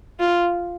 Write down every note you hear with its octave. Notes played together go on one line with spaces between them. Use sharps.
F4